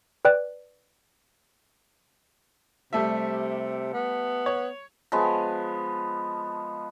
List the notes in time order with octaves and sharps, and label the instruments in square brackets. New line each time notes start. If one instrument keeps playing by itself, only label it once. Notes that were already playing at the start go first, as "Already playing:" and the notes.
[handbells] B4 D5 G5 F#6
[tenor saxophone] C3 [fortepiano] G3 A3 E5
[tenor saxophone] B3
[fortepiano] C#5
[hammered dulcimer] F3 G#3 B3